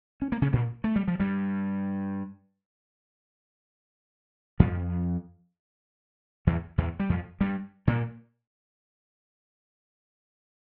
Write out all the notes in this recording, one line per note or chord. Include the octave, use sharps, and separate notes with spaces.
C#4
A#3
C#3 C#4
A#2 A#3
A3
G3
F3
G2 G3
F2 F3
E2 E3
E2 E3
G3
F2 F3
G2 G3
A#2 A#3